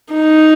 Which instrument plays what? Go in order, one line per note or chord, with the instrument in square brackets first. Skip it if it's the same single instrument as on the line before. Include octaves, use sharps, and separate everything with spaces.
[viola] D#4